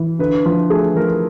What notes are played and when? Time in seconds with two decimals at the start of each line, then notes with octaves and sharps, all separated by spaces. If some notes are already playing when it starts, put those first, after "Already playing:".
Already playing: E3
0.19 D3 B4
0.46 F3
0.70 A3 G#4
0.96 F3 A#4